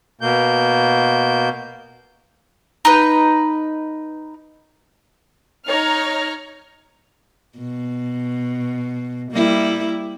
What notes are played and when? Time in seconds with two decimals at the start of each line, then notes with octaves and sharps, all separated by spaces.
0.21 B2 A#3 G6
2.85 D#4 B4
5.68 D#4 C#5 A#5 F6
7.58 B2
9.32 G3 A#3 E4